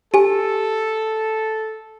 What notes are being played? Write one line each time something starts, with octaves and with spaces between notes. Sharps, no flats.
G4 A4 G#5